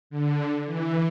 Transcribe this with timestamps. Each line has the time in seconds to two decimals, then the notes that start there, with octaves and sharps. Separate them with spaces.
0.10 D3
0.66 E3